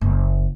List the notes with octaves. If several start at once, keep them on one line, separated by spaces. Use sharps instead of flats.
F#1